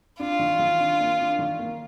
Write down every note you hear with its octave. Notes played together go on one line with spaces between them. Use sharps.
D4 F4
D#3
D#3
D4
A#3
D4
D#3
A#3